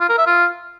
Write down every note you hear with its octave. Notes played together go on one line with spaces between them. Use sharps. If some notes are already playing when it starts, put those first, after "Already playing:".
F4
A#4
E5
F4